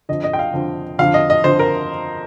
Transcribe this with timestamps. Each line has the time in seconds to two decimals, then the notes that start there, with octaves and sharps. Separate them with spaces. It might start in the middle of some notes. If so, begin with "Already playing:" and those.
0.09 F2 D3 D#5
0.24 D#5
0.33 G5
0.39 F5
0.53 F2 D3
0.99 F2 D3 F5
1.14 D#5
1.30 D#5
1.44 F2 D3 C5
1.59 A#4